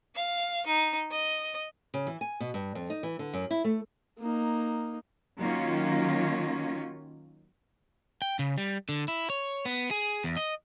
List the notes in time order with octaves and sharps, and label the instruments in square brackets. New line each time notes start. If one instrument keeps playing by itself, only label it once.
[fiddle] F5
D#4
D#5
[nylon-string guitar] C#3
E3
G#5
B2
G2
F2
D#4
E3
D3
F#2
E4
A3
[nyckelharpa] A#3 D#4
[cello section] D#3 F#3 A#3 C#4 F4
[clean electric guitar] G5
C#3
G3
D3
E4
C#5
B3
G#4
E2
D#5